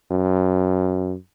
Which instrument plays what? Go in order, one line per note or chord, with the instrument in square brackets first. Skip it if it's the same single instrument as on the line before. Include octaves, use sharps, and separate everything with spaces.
[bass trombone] F#2